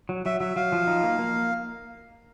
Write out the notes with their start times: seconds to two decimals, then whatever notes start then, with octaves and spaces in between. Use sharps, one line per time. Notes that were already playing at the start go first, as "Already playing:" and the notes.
0.09 F#3
0.26 F#3 E5
0.41 F#3 E5
0.56 F#3 F5
0.72 F3
0.87 D#4
1.03 A#3
1.19 A#3